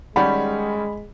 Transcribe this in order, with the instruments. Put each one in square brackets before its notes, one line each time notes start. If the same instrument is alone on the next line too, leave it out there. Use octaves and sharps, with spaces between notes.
[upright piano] D#3 G3 C#4 [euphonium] G#3 [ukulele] G4 D5 F#5 [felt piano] B5